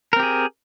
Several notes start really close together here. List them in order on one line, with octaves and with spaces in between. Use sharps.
A#4 C4 G4 G#4